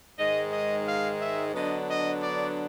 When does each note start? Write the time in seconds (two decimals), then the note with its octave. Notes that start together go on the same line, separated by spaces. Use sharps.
0.17 G#2 D#3 G#3 D#5
0.51 D#5
0.86 F5
1.20 E5
1.53 D3 F#3 B3 D4 D#5
1.87 D#5
2.22 D5